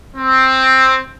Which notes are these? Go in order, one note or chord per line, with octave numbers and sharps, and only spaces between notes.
C4